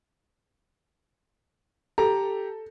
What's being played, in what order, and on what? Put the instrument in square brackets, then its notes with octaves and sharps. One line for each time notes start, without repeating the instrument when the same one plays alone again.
[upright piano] G4 A#5 [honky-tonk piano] A4